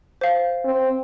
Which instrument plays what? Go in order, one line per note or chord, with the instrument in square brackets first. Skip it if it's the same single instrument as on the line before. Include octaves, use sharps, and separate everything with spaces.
[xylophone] C5 F5
[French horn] C4